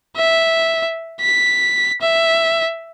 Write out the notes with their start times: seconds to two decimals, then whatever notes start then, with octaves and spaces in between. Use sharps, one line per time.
0.16 E5
1.21 B6
2.01 E5